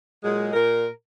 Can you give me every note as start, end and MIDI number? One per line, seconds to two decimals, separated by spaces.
0.24 0.52 46
0.24 0.52 54
0.24 0.52 56
0.53 0.87 46
0.53 0.87 70